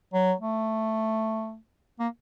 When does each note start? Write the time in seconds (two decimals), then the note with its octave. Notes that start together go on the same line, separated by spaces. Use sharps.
0.13 F#3
0.40 A3
1.99 A#3